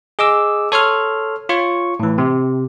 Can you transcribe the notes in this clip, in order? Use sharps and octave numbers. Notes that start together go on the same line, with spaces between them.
G#4 D#5 D6 E6
A4 C#5 C6 F6
F4 C#5 C#6
A2 E3
C3